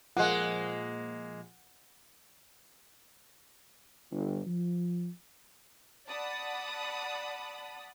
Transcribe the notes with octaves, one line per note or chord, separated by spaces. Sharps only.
A#2 F3 G#3 A#3 F#5
G1
F3
D5 F#5 A5 B5 D#6